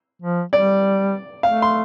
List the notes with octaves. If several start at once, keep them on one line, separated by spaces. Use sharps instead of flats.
F3
G3 D5
A3 F5
C6